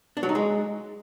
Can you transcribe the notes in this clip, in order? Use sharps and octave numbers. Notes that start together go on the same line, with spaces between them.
D4
F#3
D#4
G#3